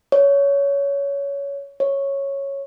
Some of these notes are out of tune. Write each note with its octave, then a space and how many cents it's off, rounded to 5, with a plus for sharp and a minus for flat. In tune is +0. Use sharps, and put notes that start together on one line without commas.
C#5 +20
C#5 -5